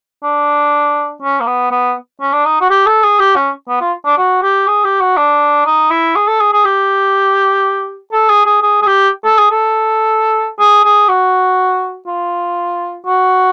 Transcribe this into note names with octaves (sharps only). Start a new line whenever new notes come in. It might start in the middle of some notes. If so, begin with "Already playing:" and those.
D4
C#4
A#3
B3
B3
C#4
D4
D#4
F#4
G4
A4
G#4
G4
C#4
B3
F4
D4
F#4
G4
G#4
G4
F#4
D4
D#4
E4
G#4
A4
G#4
G#4
G4
A4
G#4
G#4
G#4
G#4
G4
A4
G#4
A4
G#4
G#4
F#4
F4
F#4